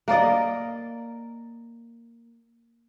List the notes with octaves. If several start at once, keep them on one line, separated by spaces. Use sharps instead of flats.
A#3 A#4 D5 D#5